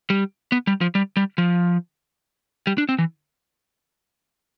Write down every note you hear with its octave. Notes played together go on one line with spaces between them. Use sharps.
G3
B3
G3
F3
G3
G3
F3
G3
D4
C4
E3